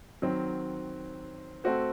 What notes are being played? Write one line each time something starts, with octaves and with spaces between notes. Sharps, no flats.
D#3 F#3 C4
A3 C4 F#4 C5